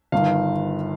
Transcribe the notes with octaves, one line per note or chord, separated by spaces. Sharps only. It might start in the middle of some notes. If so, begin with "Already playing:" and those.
G1 G2 D#3 F5